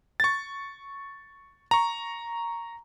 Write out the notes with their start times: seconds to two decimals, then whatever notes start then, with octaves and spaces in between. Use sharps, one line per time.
0.20 C#6 A6
1.71 A#5 C#6